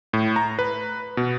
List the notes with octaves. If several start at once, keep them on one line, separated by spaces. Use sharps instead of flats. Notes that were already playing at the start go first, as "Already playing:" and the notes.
A2
A#5
B4
B2